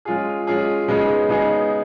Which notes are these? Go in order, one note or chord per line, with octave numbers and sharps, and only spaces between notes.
G#3 C#4 F4 G#4
G#3 C#4 F4 G#4
C#3 G#3 B3 D#4 G#4
C#3 G#3 B3 D#4 G#4